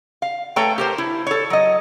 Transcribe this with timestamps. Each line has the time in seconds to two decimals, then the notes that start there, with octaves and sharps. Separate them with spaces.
0.22 F5
0.56 A3 A4 B4 C#5 G5 A#5
0.78 G4 A#4 C5
0.98 E4
1.27 A4 C#5
1.50 F#3 D#5